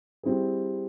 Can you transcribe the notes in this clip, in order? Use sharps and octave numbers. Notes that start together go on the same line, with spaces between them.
G3 C4 E4 G#4